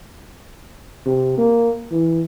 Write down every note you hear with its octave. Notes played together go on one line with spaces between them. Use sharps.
C3
A#3
E3